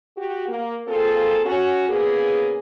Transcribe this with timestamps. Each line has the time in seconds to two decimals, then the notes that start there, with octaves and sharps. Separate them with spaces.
0.17 F#4 G4
0.48 A#3
0.87 A#3 C4 F4 G#4 A4
1.46 C#4 F#4
1.89 A#2 C#3 A#3 B3 G#4